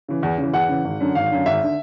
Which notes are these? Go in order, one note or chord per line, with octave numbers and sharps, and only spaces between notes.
C#3 E3
E2
C#3 E3
E2 F#5
C#3 E3
G#1
F#2 D3
G#1 F5
F#2 D3
G#1 E5
D3